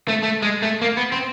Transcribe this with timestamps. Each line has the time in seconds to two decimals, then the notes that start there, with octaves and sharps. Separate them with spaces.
0.08 A3
0.23 A3
0.42 G#3
0.62 A3
0.82 A#3
0.97 B3
1.12 C4